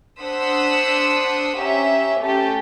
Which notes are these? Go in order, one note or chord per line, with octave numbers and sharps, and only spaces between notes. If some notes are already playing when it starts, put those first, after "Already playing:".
D4 C5 F#5 D#6 E6 B6
C#4 G4 E5 A#5
A3 C#4 G4 A5